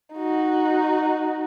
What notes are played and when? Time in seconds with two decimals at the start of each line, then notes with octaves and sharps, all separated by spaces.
0.14 D#4 F#4